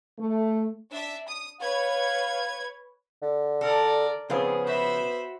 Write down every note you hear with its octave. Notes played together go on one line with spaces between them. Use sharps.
A3
D4 E5
D#6
B4 C#5 F5 G#6
D3
A4 A#4 D5
C#3 F3 B3 C4 G#4 F5
F#4 C5 E5 B5